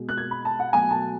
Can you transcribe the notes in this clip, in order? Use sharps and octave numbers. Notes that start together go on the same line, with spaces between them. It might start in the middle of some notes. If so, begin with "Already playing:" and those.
Already playing: B2 G#3
F#6
G#6
B5
A5
F#5
B2 F#3 A3 G#5
A5